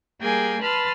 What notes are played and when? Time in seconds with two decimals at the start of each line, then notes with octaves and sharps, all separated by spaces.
0.21 G3 A#3 G#4 G5 G#5
0.62 B4 A5 B5 C6 F6 A6